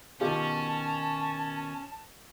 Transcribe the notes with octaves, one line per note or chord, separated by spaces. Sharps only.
B2 D#3 C#4 F4 G4 A5